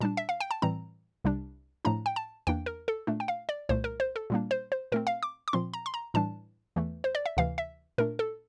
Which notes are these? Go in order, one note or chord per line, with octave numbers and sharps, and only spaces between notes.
A#2 G3 D4 A5
E5
F5
G5
A5
A2 E3 G3 C4 A#5
C2 C3 G3 D4
A2 F3 A3 D4 A#5
G5
A5
E2 E3 A#3 D4 G5
A#4
A4
A#2 A3 D4
G5
F5
D5
C2 A#2 A3 C5
A#4
C5
A4
A#2 G3 A#3 D4
C5
C5
A#2 A3 C4 A#4
F5
D6
D6
A#2 F3 C4 C6
A#5
C6
A#5
A2 E3 G3 D4 A5
E2 E3 A3
C5
D5
E5
D2 C3 E3 F5
E5
A#2 A3 D4 A#4
A4